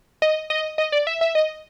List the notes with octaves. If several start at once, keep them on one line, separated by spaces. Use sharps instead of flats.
D#5
D#5
D#5
D5
E5
E5
D#5